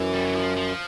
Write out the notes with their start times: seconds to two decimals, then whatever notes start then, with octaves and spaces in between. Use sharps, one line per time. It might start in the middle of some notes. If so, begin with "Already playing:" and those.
Already playing: F#2 E3
0.14 G3
0.24 F#3
0.35 F3
0.56 F3